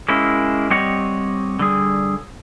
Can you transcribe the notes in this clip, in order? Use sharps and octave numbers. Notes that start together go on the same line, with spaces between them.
G#3 A#3 C#4 E4
G3 C4 G4 C#5 D#5 F#5
D3 G3 G#4